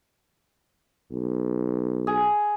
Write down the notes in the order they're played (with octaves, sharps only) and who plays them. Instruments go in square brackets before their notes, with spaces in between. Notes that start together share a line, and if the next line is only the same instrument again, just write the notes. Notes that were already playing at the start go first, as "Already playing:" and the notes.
[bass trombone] B1
[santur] G#4